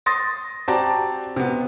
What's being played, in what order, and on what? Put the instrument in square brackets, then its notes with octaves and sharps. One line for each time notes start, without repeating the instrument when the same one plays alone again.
[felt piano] C6 D#6 A6 A#6
C4 F#4 G4 D5 A5 A#5
C3 B3